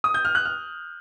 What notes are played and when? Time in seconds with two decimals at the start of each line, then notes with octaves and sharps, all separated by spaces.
0.04 D#6
0.14 G6
0.25 F6
0.35 F#6
0.45 F6